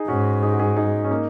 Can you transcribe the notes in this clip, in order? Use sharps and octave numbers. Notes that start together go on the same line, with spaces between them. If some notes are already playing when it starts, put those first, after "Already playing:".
Already playing: D#4 G#4
G#2 C#4 F#4
D#4 G#4
F#4
D#4 G#4
D#4 G#4
C#4
A#3 D#4